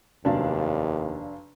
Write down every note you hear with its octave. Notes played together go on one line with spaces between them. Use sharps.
F1 D#2 F#3 D4 F5 A5